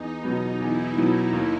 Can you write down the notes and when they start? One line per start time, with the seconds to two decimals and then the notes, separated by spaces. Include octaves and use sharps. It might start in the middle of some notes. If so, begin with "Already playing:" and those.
Already playing: E2 D#4
0.22 B2 F#3 B3
0.60 E2 E4
0.96 B2 F#3 B3
1.33 D#2